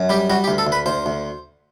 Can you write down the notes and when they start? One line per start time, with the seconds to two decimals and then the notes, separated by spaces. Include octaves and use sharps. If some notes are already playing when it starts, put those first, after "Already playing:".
Already playing: F#2
0.09 G3 G4
0.30 G3 F#4
0.44 G4
0.48 D2
0.58 A4
0.67 D2
0.72 B4
0.86 D2 C5
1.06 D2